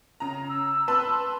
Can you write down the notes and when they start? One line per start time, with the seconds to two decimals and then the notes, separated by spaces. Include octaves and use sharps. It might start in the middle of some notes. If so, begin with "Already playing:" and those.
0.20 C#3 A#5
0.49 E6
0.88 B4 A5 C6